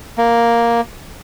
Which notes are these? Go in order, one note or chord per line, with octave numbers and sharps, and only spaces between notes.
A#3